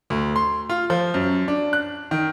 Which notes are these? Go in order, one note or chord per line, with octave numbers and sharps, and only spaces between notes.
D2
C6
F4
F3
F#2
D4
F#6
D#3